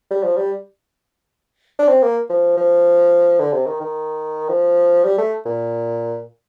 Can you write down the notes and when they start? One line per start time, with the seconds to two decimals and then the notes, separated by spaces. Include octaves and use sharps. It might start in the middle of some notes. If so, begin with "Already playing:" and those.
0.11 G3
0.23 F3
0.37 G3
1.79 D4
1.88 C4
2.03 A#3
2.30 F3
2.57 F3
3.40 D3
3.53 C3
3.67 D#3
3.81 D#3
4.49 F3
5.04 G3
5.18 A3
5.46 A#2